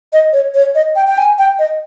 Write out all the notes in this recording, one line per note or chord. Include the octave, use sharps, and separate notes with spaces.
D#5
C#5
C#5
D#5
G5
G5
G#5
G5
D#5